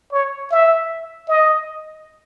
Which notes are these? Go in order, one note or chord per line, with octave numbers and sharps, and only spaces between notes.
C#5
E5
D#5